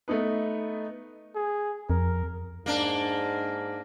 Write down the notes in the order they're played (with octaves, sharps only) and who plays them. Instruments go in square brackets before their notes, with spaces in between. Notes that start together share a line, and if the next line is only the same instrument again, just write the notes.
[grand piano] A3 B3 D#4 B4
[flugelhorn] G#4
[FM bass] F2 [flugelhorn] A#4
[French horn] G#2 [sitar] A#3 D4